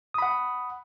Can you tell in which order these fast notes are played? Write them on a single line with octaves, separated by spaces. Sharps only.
D#6 B5 F#5